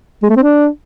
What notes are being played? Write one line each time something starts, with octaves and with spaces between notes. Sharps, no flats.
G#3
A3
C4
D4